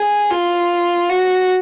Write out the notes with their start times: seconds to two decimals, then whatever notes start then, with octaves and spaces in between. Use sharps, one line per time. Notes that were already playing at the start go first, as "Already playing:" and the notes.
Already playing: G#4
0.31 F4
1.09 F#4